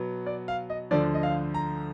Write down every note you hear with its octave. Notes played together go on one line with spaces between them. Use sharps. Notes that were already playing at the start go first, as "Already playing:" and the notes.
Already playing: B2 F#3 B3
D5
F5
D#5
D2 D3 F3 D5
D#5
F5
A#5